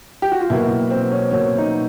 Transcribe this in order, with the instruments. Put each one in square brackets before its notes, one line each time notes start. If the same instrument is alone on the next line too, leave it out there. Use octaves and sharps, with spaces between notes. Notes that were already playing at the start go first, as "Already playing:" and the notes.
[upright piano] G4
F#4
F4
[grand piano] B2 F#3 A#3 [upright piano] E4
[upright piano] C4
C#4
[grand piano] B2 F#3 A#3 [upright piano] C#4
[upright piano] D#4